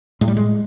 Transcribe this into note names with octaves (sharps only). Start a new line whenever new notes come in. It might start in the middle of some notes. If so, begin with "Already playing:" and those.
A2 G#3
G3
G#3